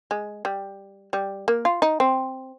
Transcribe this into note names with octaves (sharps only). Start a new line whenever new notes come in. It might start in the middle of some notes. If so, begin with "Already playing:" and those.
G#3
G3
G3
A#3
F4
D#4
C4